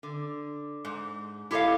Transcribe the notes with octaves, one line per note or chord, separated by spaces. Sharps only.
D3
G#2
E4 G4 A4 C#5 D#5 F5